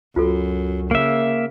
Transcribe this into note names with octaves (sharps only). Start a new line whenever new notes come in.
C#2 F#2 F4 F#4 A4
C#3 A#3 E5